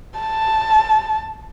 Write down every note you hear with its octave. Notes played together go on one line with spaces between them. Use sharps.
A5